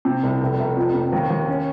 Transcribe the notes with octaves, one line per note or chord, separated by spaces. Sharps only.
C3
C2
F1
F1
F2
C3
D#2
D#2
C#4